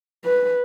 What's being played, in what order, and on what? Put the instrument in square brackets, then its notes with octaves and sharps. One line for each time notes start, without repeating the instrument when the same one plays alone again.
[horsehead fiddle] B4